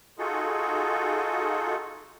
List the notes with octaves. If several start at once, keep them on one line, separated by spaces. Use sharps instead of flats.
D#4 F4 F#4 G#4 A4